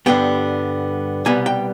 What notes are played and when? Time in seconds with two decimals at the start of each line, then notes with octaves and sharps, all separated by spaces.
0.06 G2 D3 G3 B3 G5
1.25 C2 B2 G3 B3 G#5
1.46 G5